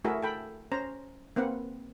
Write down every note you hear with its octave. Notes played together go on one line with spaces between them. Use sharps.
A3 E4 F#4 G#4 A#4 E5
A4 G5 B5
C#4 C5 A#5
A#3 C4 B4 F#5